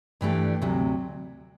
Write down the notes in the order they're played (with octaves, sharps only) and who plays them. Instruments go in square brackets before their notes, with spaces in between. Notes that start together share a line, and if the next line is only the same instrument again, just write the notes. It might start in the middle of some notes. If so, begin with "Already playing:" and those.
[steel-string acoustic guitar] G2 E3 A3 D4 G4
D2 C3 F#3